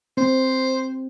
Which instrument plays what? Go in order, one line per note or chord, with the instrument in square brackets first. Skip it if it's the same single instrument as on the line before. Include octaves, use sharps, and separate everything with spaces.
[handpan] C4 [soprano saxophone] C5